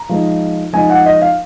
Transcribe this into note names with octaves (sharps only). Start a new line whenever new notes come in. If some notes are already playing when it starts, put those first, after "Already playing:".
Already playing: A#5
F3 G#3 D#4
F3 G#3 D#4 G#5
F#5
D#5
F5